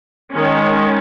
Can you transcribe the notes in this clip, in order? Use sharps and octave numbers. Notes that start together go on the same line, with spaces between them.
D#3 G#3 C#4